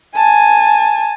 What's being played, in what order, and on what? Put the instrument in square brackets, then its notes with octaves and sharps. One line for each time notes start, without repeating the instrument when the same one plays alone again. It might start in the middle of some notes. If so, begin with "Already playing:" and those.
[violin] G#5 [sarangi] A5